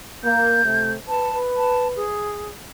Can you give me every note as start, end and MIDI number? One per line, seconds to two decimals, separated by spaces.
0.24 0.63 58
0.24 0.91 91
0.64 0.96 48
0.64 0.96 57
1.08 2.07 71
1.08 1.38 81
1.57 1.88 81
1.96 2.49 68